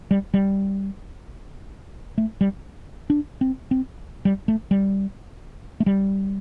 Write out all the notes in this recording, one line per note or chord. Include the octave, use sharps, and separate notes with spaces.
G3
G3
A3
G3
D4
C4
C4
G3
A3
G3
A3
G3